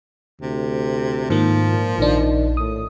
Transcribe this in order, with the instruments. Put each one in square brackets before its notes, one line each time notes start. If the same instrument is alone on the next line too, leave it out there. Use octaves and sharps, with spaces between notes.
[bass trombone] D2 [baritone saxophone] C3
[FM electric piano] G#2 D#3 A#3 [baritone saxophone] F3
[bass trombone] A#2
[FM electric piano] A#1 D4 [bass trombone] D#3
[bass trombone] A2 [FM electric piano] D#6